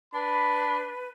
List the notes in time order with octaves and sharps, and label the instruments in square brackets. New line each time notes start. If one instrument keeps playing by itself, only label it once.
[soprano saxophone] D4 [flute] B4 [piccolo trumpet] B5